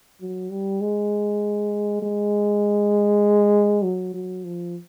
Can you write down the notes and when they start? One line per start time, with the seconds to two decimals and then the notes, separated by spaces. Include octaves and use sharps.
0.21 F#3
0.50 G3
0.81 G#3
2.02 G#3
3.84 F#3
4.14 F#3
4.44 F3